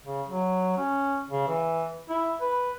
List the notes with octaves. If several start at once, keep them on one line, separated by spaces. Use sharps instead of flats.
C#3
F#3
C#4
C#3
E3
E4
B4